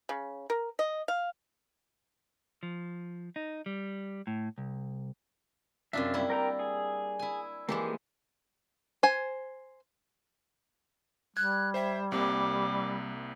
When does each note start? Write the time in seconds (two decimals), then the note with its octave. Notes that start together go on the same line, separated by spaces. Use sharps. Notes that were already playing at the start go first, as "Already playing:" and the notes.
0.09 C#3
0.50 A#4
0.79 D#5
1.08 F5
2.63 F3
3.36 D#4
3.66 G3
4.27 A2
4.58 C2
5.93 F#2 C3 D4 F4 E5
6.14 G3 A#3 E4
6.30 A#4 G5 A#5
6.59 G#4
7.19 E4 G#5
7.69 E3 F3 G#3 A#3 G4
9.03 C5 G#5
11.37 G3 F#6 G#6
11.74 C5 E5 G5
12.12 C2 C3 A#3 D6